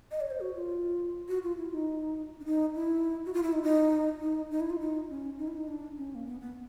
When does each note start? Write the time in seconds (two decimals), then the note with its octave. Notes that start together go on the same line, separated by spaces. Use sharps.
0.11 D#5
0.21 C#5
0.31 C5
0.40 F#4
0.55 F4
1.28 F#4
1.43 F4
1.58 E4
1.72 D#4
2.41 D4
2.45 D#4
2.75 E4
3.26 F#4
3.34 F4
3.43 E4
3.53 D#4
3.63 D#4
4.21 D#4
4.51 D#4
4.60 E4
4.70 F4
4.80 D#4
5.09 C#4
5.39 D#4
5.48 E4
5.57 D#4
5.68 D4
5.97 C#4
6.15 A#3
6.26 B3
6.41 B3